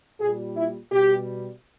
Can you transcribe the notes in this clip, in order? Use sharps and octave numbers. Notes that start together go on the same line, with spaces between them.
A#2 G3 G#4
E4
B2 G3 G4